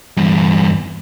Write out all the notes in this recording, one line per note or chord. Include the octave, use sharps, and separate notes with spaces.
E2 G2